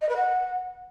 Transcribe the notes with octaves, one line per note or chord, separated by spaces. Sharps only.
D#5
B4
F#5